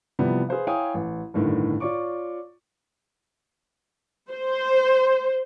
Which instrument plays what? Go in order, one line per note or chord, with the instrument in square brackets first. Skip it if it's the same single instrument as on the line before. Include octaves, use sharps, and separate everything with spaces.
[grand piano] C3 E3 F3 G3 B3
G#4 B4 C5 F5
E4 C#5 F5 G5 G#5 D#6
A1
G1 C2 A2 D3 D#3
F4 C#5 D5 C#6 D6
[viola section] C5